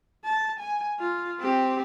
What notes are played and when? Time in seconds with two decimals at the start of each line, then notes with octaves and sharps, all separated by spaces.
0.24 A5
0.60 G#5
1.00 F4
1.40 C4 G4